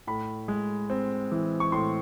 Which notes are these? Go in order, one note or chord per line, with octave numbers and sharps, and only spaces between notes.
A2 B5
G#3
C4
E3
C#6
A2 C6